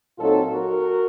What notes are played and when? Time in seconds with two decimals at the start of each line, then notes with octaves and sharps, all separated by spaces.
0.18 A#2 F#3 C4 D#4 F4 A4
0.51 F#4 A#4